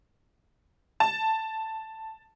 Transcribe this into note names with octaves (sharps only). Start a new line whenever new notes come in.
A5